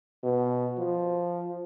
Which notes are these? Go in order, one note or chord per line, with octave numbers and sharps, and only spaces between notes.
B2
F3